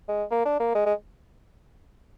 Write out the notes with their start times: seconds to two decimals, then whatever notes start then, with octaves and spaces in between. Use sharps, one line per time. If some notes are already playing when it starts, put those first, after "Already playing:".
0.08 G#3
0.31 A#3
0.45 D4
0.60 A#3
0.75 G#3
0.86 G#3